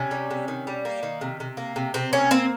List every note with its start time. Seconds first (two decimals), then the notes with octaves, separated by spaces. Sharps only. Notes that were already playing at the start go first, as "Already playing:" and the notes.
Already playing: C3 C#4
0.11 G3
0.31 C3
0.48 D#3
0.67 G3
0.85 A#3
1.03 D#3
1.21 C3
1.40 C3
1.57 A#3
1.76 C3
1.94 C3 C4
2.13 A#3 C#4
2.31 A#3 C4